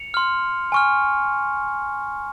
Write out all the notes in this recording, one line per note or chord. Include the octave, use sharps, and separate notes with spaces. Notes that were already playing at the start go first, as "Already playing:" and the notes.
Already playing: C#7 F7
C6 F6
G#5 C#6 F6